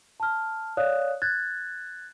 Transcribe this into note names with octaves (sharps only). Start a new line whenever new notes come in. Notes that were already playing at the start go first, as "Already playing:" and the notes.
A5 F6
C#5 D5 F5 D#6 F#6
F#6 G#6 A6